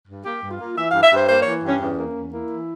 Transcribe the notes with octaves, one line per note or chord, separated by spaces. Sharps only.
G2
A#3 G4
G2
F4
A#3
E3 E5
G2 F5
E5
G2 C5
A#3 C5
E3 C#5
G2 C#4
E2 C#4
A#3
C#4
E2
A#3 E4
E3